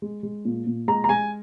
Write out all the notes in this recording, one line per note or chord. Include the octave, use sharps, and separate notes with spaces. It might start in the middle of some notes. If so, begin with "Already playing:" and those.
G#3
G#3
A#2
A#2
G#3 A#5
A#5
G#3 G#5